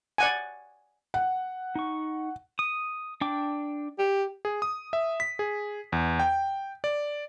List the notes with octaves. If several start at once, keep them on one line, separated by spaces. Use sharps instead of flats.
D5 F#5 G#5
F#5
D#4 C#6
D#6
D4 G5 D6
G4
G#4
D#6
E5
B6
G#4
E2
G5
D5